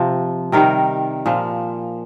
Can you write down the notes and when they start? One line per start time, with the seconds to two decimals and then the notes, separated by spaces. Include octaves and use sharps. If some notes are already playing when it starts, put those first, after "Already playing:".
Already playing: C3 F3
0.52 C3 D#3 G3 A#4
1.26 A#2 F3